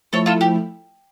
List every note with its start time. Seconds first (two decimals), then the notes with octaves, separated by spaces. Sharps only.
0.13 F3 A3 E4 A4 C#5
0.26 F4 A4
0.41 G4